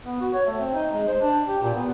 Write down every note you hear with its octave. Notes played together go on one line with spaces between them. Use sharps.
B3
F#4
C#5
A3
C4
D#4
G#3
C5
D4
G4
A#2
B3